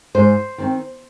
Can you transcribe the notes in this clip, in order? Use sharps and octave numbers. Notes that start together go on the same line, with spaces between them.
G#2 C5
D#3 C4